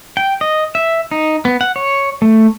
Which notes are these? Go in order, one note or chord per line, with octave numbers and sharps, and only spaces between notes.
G5
D#5
E5
D#4
B3
F#5
C#5
A3